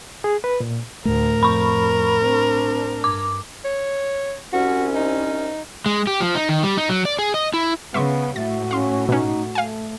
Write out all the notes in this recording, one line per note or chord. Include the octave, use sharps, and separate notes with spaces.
G#4
B4
A#2
D2 A2 A3 A#4
F2 B5 C#6
C4 D4
G2 D6
C#5
C2 C#4 F#4
D#4
G#3
G4
F3
D#4
D#3
G3
D#4
F#3
D5
G#4
D#5
E4
C#3 B3 C#4 E5 C6 C#6
A2 F#4 E5 A6
C#4 F5 C6
B2 C#4 D#4
A3 F5 G#5